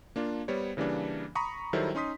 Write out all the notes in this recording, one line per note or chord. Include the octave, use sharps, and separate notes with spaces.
A#3 D4 F4
G3 B3 C5 C#5
C#3 E3 G3 A#3 D4
A#5 B5 C#6 D#6
D#3 F#3 G3 E4 A4 C5
C#4 D#4 C6 D#6 B6